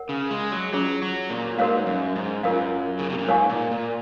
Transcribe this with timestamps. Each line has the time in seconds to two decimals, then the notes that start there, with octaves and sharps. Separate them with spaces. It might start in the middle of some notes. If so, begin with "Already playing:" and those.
Already playing: A#4 C#5 F#5
0.09 C#3
0.31 G#3
0.52 F#3
0.73 F#3 C#4 F4 G#4 C#5
1.02 F#3
1.30 A#2
1.59 G#2 F#4 A#4 C#5 F5
1.86 F#2
2.16 G#2
2.43 F#2 F4 A#4 F5
2.99 C#3
3.10 C3
3.18 A#2
3.28 G#2 A#4 C#5 F5 G#5 C#6
3.50 A#2
3.71 A#2